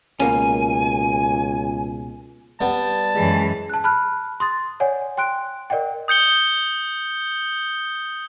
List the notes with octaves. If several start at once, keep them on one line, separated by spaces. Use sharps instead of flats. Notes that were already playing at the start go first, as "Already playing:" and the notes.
C#2 B2 A#3 C#4 G#5
G3 B3 A5
F#2 E3 G#3
A5 F#6
A5 B5 F6 F#6
C6 D#6 A6
C#5 D5 F#5 G#5
G5 C6 F#6 D7
A#4 D5 D#5 F#5 G5
D#6 G6 C#7 G7